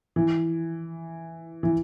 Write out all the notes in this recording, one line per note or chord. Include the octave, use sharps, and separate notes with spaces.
E3
E3